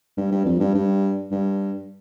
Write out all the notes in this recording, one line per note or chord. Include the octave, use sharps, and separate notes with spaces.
G2
G2
F2
G2
G2
G2